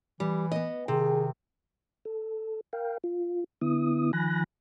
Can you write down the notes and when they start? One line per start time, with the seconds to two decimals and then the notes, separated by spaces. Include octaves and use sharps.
0.20 E3 G3
0.52 B3 D#5
0.88 C3 D#3 G#4
2.05 A4
2.73 A#4 F5 G5
3.04 F4
3.61 D3 B3 E4 D#6
4.13 D#3 F3 G#5 B5 F#6 A#6